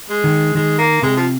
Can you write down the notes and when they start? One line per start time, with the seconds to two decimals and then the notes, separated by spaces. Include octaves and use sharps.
0.10 G#3
0.24 D#3
0.55 D#3 G#3
0.78 A#3
1.02 C3 G#3
1.17 F3